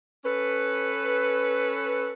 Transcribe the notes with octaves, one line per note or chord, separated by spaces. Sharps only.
C#4 A4 B4